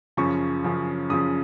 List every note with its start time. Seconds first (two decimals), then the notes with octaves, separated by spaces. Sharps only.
0.17 F#2 C#3 F3 C#6
0.64 F#2 C#3 F3
1.10 F#2 C#3 F3 D#6